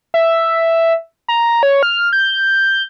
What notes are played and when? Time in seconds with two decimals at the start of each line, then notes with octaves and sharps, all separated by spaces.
0.14 E5
1.28 A#5
1.63 C#5
1.83 F6
2.13 G6